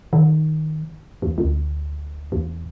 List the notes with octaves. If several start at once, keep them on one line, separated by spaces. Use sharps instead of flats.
D#3
E2
D2
E2